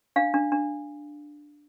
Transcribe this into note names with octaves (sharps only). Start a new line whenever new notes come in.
D4 F5
D4
D4